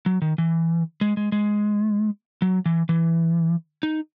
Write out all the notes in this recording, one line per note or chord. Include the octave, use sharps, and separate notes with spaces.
F#3
D#3
E3
G#3
G#3
G#3
F#3
E3
E3
D#4